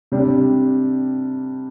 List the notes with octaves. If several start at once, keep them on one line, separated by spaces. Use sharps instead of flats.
C3 G3 D4